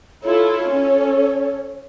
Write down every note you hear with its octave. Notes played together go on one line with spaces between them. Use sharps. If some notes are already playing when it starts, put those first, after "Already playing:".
E4 F4 A4 C#5
C#4 A4